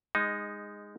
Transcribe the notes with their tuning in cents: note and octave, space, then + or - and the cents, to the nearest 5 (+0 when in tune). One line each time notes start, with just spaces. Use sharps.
G#3 -20 D#4 +0